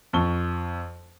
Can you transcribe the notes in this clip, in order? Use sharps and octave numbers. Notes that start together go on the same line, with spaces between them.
F2 C#6 G7